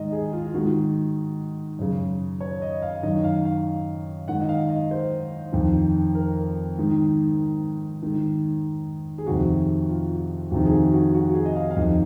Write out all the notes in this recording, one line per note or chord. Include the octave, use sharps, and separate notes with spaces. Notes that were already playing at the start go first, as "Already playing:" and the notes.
Already playing: G#2 D#3 D#5
G#4
F4
F4
G#2 D#3 F#4
F#2 C#3
C#5
D#5
F5
F#2 D#3 D#5
F5
F5
G#2 D#3 F#5
D#5
F5
D#5
C5
F2 D#3
A#4
G#2 D#3
G#2 D#3
G#4
F2 C3 D#3 F#4
F4
F2 C3 D#3 F#4
G#4
F#4
F#4
F#4
F#4
G#4
D#5
F5
F5
F2 D#3 D#5